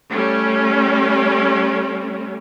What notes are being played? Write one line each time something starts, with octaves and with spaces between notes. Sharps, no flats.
G3 A3 C#4